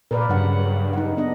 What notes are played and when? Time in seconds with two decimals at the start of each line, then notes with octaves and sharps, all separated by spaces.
0.11 A#2 A#4 B4 D5
0.29 G2 C#3 F#3 F#5
0.93 D#4 F#5
1.17 B3 D4 D#5